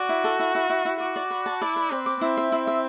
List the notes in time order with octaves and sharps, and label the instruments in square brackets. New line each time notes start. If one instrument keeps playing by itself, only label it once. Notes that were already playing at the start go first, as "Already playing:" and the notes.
Already playing: [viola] F#4 [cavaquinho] D5
[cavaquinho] E4
A4
E4
E4
E4
E4
[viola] F#4 [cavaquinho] D6
[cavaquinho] D5
B4
A5
[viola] E4 [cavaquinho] D5
[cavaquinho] B4
[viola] C4 [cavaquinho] B4
[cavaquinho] D6
[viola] C4 [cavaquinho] E4
[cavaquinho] E5
E4
E5